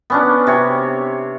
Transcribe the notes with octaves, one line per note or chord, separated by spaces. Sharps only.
B3 C#4 D4
C3 C#5